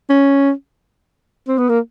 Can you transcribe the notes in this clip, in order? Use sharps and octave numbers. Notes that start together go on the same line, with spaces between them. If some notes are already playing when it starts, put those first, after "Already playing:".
C#4
C4
B3
A#3